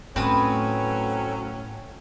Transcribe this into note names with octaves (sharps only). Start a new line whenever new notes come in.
A2 F#3 A3 C4 C#4 B4 D#6